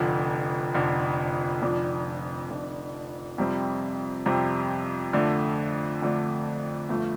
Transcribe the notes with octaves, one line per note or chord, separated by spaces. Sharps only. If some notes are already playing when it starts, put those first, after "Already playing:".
Already playing: F1 F2 D3 F3
F1 F2 D3 F3
F1 F2 F3 D4
F1 F2 F3 D4
F2 C3 G3 C4
F2 C3 G3 C4
F2 D3 A3 D4
F2 D3 A3 D4
G1 F2 F3 A3